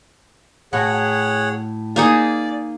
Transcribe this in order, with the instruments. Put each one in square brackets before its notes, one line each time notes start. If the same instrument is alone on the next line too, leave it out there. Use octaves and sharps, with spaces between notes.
[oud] A2 F#4 [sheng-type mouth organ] G#4 C#5 F#5
[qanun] A#3 D#4 G#4 [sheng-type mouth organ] D5